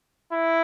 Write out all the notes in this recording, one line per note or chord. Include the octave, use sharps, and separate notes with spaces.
E4